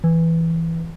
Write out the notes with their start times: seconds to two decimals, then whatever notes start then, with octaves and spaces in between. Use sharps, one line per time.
0.04 E3